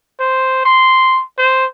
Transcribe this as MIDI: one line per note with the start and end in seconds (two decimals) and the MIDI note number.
0.20 0.63 72
0.65 1.22 84
1.38 1.66 72